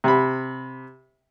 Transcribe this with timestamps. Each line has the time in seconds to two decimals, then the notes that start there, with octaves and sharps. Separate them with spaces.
0.04 C3 B5